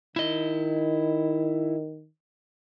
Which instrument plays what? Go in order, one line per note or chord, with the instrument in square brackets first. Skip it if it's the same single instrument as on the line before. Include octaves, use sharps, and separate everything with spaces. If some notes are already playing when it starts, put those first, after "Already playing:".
[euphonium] D#3 [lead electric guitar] E4 D#5